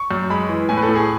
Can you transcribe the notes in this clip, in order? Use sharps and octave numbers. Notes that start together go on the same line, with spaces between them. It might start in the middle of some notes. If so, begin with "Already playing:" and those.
Already playing: C#6
F#2
G#3 B5
E3
A2 G#5
B4
A4
A2
G#4